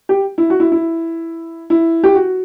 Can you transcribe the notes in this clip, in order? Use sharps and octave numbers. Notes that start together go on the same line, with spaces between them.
G4
E4
F#4
E4
E4
E4
G4
F#4